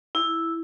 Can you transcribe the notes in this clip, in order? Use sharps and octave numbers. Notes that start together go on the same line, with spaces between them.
E4